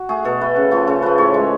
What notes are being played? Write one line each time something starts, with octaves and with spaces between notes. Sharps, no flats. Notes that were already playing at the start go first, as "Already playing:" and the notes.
Already playing: F#4
A3 G#4
B2 A4
A3 B4
C#3
F3 A3
C#3 A4
F3 A3 B4
A2 C#5
G#3